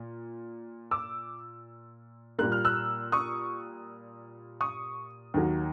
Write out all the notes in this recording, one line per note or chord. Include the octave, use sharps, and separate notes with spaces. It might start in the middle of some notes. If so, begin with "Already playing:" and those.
Already playing: A#2
D6 E6
A#2 G3 A#3 F#6
F6
E6 F#6
C#6 D#6
C#6 D#6
D#2 D#3 F#3